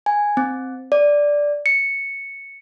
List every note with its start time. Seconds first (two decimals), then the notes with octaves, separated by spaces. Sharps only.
0.06 G#5
0.37 C4
0.92 D5
1.66 C#7